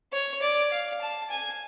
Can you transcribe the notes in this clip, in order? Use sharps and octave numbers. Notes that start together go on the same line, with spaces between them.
C#5
D5
F5
A5
G#5